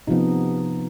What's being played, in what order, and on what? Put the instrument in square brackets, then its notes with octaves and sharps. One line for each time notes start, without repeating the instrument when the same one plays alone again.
[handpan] C3 F3 B3 D#4